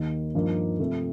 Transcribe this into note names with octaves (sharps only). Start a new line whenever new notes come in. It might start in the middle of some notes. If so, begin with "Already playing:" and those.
Already playing: D#2 D#3 A#3 D#4
G2 F3 A#3 D#4
C3 F3 A3